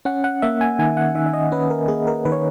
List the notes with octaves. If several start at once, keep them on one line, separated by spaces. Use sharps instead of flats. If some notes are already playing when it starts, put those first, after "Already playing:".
C#4 F#5
F#5
A#3 E5
G#5
D#3 G#5
F#5
D#3 E5
E5
D#5
C#4 B4
A#4
A#3 G#4
A#4
D#3 B4
C#5